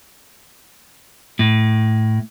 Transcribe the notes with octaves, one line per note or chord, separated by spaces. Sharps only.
A2